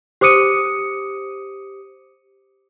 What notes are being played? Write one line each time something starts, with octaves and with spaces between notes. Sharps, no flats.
G4 C5 D6 D#6 C#7 D#7